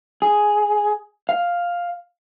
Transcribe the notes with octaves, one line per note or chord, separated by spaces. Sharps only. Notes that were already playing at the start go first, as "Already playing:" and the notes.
G#4
F5